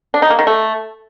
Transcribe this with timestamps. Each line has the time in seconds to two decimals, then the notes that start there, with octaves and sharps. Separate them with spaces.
0.14 D4
0.22 D#4
0.30 A#3
0.39 D#3
0.47 A3